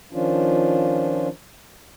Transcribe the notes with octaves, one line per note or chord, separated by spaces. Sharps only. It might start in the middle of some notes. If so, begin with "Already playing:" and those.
D#3 F3 C#4 D4 F4